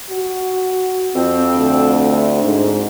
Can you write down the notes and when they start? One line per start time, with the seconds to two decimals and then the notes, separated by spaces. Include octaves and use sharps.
0.11 F#4
1.16 F2 C4
1.56 D2
2.43 G#2